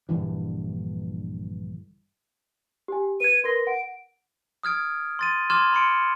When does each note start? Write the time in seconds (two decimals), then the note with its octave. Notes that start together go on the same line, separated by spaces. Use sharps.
0.09 A#1 G2 D3 E3
2.88 G4 G#5
3.20 B4 G#6 D#7
3.44 A#4 B4 C6 A#6
3.67 F#5 D7
4.63 D#6 F6 G#6 D7
5.19 C6 A6 D#7
5.50 C6 D6 F6 G#6 E7
5.73 B5 C6 C#7 D7